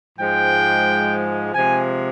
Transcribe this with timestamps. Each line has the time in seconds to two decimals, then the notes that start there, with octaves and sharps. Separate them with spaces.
0.18 G#2 F3 G#3 G5
1.54 C3 F3 G#3 G#5